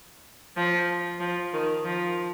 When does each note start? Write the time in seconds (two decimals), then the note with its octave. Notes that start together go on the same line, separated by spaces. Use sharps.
0.56 F3
1.20 F3
1.53 D#3
1.85 F3